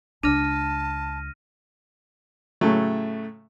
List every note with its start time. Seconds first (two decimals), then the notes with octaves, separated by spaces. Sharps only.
0.23 C#2 D4 A5 F6 A#6 D#7
2.61 A2 C#3 F#3 A3